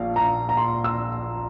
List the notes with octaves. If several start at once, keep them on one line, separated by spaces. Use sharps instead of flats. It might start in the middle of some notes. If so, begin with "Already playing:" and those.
Already playing: A#1 F5
A#5
A#5
C6
E6